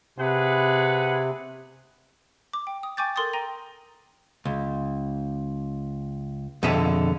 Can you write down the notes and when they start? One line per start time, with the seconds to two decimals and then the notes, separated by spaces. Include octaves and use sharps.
0.18 C3 G#4 B4 F#5
2.53 D6
2.67 G5
2.83 D#6
2.97 G5 G#5 C#6 D6 G6 A6
3.16 A4 A#4 C6 D6 D#6 A6
3.33 G5 A#5 A#6 D#7
4.45 C#2
6.63 F2 B2 D3 G#4 E5